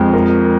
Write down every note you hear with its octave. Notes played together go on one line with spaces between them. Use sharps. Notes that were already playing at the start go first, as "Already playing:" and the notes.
Already playing: F2 G#3
A#4